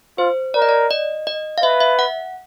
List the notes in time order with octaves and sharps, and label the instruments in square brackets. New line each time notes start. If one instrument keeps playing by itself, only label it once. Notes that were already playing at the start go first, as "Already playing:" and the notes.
[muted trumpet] F4 [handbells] C5
[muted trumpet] A#4 [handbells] D5
[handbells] D#5
D5
D#5
D#5
F5
[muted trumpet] B4 [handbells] E5
[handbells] E5
F#5